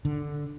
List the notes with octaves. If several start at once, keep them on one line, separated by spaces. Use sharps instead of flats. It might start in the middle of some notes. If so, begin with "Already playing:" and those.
D3